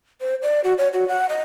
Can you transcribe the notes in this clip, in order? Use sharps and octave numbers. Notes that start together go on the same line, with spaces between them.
C5
D5
F#4
C#5
F#4
F#5
D#5